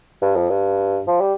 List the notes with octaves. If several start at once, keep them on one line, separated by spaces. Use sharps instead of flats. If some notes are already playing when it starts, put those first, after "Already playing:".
G2
F2
G2
F3
G3